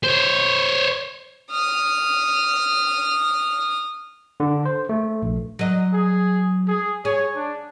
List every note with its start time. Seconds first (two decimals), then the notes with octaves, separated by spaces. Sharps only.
0.04 C5 C#5
1.51 D#6 F6
4.40 D3
4.65 C5
4.89 A3
5.22 A#1
5.59 F#3 D#5
5.93 G#4
6.68 G#4
7.05 G#4 C#5
7.36 D4